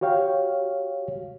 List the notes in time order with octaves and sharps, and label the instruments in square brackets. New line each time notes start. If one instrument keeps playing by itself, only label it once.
[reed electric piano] F#4 G4 C#5 F5 G5